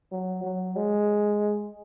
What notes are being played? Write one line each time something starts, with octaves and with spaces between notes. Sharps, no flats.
F#3
F#3
G#3